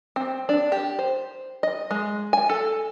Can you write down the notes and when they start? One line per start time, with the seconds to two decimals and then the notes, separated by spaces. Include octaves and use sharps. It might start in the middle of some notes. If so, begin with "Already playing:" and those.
0.16 C4
0.49 D4
0.72 G4
0.99 C5
1.63 D#5
1.91 G#3
2.33 G#5
2.49 A4